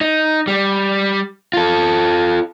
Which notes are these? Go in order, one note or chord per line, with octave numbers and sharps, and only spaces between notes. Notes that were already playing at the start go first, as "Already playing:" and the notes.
D#4
G3
F4 A4